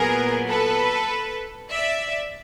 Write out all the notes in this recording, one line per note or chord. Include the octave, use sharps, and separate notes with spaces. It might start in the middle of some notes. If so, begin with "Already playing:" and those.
Already playing: A#2 F#3 B3 G#4 A#4
A4 B4
D5 E5